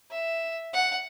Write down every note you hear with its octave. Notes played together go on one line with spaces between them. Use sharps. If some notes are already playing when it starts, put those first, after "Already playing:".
E5
F#5